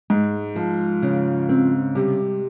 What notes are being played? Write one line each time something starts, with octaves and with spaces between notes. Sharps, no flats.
G#2 G#3
F3
C#3
C4
C3 G3